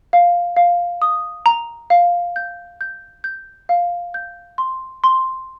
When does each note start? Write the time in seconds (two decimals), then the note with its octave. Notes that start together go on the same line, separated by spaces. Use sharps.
0.13 F5
0.57 F5
1.02 D#6
1.46 A#5
1.90 F5
2.36 G6
2.81 G6
3.24 G6
3.69 F5
4.14 G6
4.58 C6
5.04 C6